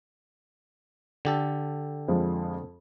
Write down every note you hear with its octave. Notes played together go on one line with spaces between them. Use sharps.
D3 G4 A4
F2 F3 G#3